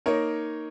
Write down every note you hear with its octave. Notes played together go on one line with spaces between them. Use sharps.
A#3 D#4 A#4 C#5